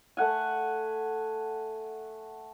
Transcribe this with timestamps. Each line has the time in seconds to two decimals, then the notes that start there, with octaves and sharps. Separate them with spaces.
0.17 A3 F#5 G#5